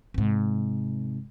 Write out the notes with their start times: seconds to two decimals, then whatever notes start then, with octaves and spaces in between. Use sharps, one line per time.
0.14 G#2 C3